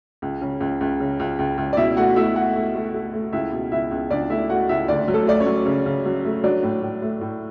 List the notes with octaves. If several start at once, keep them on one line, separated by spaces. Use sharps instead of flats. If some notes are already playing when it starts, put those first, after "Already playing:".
C#2
C#3
C#2
C#2
C#3
C#2
C#2
C#2
D5
B2 E4 E5
A3 F#4 F#5
A3 E4 E5
A3 F#4 F#5
A3
A3
A3
A3
C#2 E4 E5
B2
C#2 E4 E5
C#2
C#2 D4 D5
A3 E4 E5
A3 F#4 F#5
C#2 E4 E5
D2 D4 D5
F#3
A3 A4
A3 D5
C#4 C#5
F#3
C#3
C#3
F#3
A3
F#3 D4 D5
A2
A2
A3
A2